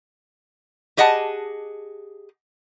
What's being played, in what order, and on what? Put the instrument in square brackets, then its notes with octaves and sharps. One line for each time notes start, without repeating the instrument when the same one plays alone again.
[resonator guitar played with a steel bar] G4 G#4 D#5 F#5 G#5 A5